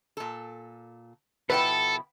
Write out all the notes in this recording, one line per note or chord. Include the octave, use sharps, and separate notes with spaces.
A#2 A4
B2 F3 E4 A4 B4 F#5 G5